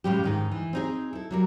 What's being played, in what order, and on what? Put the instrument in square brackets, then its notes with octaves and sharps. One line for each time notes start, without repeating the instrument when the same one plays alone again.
[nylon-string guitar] A2 C#3 F3 G3 G#3 G4
G#2 D#3 D#4
E3
C4 D#4 G#4
E4 A4
F#3 G3 A#4